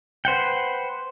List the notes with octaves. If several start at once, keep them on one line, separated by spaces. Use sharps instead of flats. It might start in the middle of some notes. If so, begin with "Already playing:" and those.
B4 C5 F#5 G5